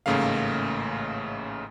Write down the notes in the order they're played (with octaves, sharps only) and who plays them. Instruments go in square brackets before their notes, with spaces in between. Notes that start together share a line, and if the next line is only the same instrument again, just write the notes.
[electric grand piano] A1 G#2 C#3 A3 A#3 F5